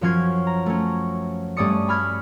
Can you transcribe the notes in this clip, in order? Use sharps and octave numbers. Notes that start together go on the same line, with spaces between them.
F#2 F3 C#4 F6 G#6 C7
A#5
A3 C#4
G2 A3 C#4 D5 D#6 C#7
G#5 B5 F6 G#6